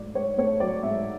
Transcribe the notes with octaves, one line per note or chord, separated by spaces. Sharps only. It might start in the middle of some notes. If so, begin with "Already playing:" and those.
Already playing: G#2 F#3 A3 D5
G#2 C#5
A3 C#5
F#3 D5
G#2 E5